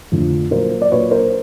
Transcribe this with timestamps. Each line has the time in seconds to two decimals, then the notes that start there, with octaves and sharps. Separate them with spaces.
0.12 F2 D3 F3 A3
0.51 A#2 F#3 A#3 A#4 C5
0.82 D5
0.91 A#2 F#3 A#3 B4 C#5
1.11 A#4 C5